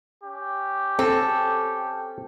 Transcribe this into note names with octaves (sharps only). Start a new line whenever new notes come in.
C#4 G4
C4 A4